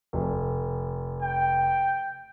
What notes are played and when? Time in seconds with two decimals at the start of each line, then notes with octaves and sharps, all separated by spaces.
0.13 F1
1.22 G5